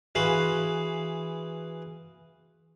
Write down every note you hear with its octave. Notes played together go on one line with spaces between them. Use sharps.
E3 F#4 G#4 F5 B5 C6